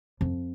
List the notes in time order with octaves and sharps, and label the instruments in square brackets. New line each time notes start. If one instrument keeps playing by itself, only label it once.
[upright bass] F2